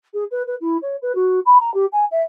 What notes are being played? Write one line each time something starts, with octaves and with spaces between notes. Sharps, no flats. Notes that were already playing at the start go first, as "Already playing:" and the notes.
G#4
B4
B4
E4
C#5
B4
F#4
B5
A#5
G4
G#5
E5